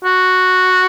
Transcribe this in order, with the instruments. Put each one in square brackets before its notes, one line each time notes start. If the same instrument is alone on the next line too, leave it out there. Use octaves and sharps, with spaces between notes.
[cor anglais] F#4